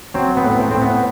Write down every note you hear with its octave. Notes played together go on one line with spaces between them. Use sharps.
F#3 C4
B3
A2
C4
A2 C4
B3